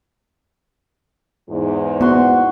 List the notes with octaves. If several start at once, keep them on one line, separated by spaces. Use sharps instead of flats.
E2 G#2
B3 F#4 C6